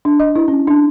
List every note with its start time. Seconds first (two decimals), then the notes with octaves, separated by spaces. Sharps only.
0.05 D4
0.20 D#5
0.36 E4
0.48 C#4
0.67 D4